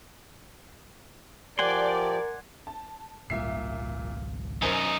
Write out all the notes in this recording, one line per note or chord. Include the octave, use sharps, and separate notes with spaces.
F3 G4 A#4 D5 F#5 G#5 C6
A5
G#1 C#2 A#2 G3 E5 C7
F#2 D#4 A#4 C5 G#5